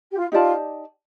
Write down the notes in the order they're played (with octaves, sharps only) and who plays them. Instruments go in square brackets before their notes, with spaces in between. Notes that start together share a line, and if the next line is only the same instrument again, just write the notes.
[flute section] G4
F4
[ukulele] D#4 G4 D5 A5 [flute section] F4